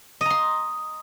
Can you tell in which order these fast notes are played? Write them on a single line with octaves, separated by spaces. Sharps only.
D#5 A#5 C6